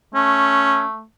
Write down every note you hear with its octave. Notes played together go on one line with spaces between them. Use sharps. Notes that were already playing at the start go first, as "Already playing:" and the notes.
A3 C#4